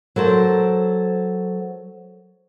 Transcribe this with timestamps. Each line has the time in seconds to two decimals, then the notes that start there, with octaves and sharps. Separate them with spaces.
0.16 F#3 A4 A#4 C5